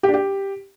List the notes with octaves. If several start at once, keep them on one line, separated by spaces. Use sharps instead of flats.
G4
D4
G4